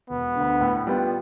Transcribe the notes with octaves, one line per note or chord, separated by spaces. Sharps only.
E1 B3
D2 D3
A2
G3 B3 F4